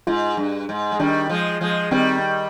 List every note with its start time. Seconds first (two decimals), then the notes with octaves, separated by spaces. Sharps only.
0.07 G#2 F4
0.37 G2
0.69 G#2
0.92 G#3
0.99 D#3 G3 D4
1.29 F3 G#3
1.61 F3 G#3
1.91 D#3 G3 C4